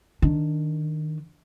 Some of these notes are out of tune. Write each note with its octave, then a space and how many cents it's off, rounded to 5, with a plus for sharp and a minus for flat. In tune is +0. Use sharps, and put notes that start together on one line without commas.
D#3 -5 D4 +0